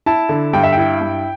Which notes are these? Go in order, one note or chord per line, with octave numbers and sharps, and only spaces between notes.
E4 A5
D3
G2 G5
E5
E4 G5
G2